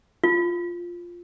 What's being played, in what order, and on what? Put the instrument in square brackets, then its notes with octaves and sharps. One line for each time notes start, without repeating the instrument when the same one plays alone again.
[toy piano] F4